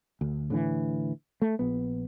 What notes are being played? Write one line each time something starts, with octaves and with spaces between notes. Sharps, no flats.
D2
A2 D3 E3
A3
A#1 B3